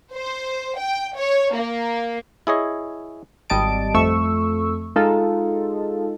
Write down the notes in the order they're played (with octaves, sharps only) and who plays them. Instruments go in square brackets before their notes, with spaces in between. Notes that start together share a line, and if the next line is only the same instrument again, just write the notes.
[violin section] C5
G5
C#5
A#3
[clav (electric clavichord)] E4 G#4 C#5 D#5
[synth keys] G#1 G3 D#5 A5 D7
F2 A3 C#6 E6
G#3 D#4 F4 A4